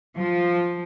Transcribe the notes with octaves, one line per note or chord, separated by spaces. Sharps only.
F3